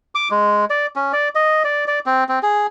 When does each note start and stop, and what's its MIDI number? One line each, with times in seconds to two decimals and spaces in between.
0.15 0.29 86
0.31 0.65 56
0.70 0.86 74
0.96 1.12 61
1.13 1.29 74
1.35 1.63 75
1.64 1.84 74
1.88 1.99 74
2.06 2.24 60
2.29 2.39 60
2.43 2.67 68